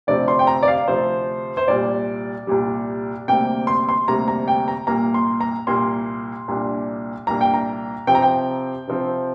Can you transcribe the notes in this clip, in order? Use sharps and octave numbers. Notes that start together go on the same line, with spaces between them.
D2 C3 F3 C4 D5
C6
G5
A#5
D5
F5
D2 C3 F3 C4 C5
C5
C2 A#2 G3 D5
C2 A#2 G3
D2 C3 G3 A#3 G5
C6
C6
D2 C3 G3 A#3 A#5
A#5
G5
A#5
C2 A#2 A#3 A#5
C6
A#5
C2 A#2 A#3 C6
C2 A#2 A#3 D4
C2 A#2 A#3 D4 A#5
G5
A#5
C3 F3 C4 G5
A#5
G5
C3 F3 C4